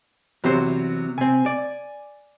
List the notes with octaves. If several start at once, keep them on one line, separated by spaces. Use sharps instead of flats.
E2 C3 F#3 C5
C3 C4 G#5
D5